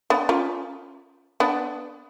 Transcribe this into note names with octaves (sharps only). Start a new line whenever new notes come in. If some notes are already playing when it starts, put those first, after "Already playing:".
B3 D4
C#4 F4
B3 D4